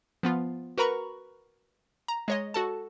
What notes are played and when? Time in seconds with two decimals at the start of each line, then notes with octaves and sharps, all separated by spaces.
0.23 F3 B3 F4
0.78 F#4 A#4 B4 A#5 B5 C#6
2.08 A#5
2.28 G#3 C#5 D#5
2.54 F#4 A4 A5